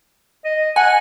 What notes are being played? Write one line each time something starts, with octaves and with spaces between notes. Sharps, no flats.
D#5
F#5 G#5